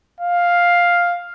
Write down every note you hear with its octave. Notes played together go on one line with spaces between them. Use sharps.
F5